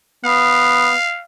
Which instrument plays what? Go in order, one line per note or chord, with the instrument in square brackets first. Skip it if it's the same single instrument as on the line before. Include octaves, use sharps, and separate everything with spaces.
[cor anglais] B3 [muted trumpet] F5